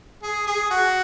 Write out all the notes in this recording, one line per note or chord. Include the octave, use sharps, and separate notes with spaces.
G#4
G#4
F#4